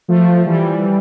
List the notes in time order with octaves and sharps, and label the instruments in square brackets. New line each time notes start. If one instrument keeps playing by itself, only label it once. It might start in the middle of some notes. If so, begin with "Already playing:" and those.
[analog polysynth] F3 A3
E3 G3